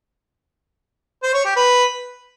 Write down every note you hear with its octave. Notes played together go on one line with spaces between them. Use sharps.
C5
C#5
G4
B4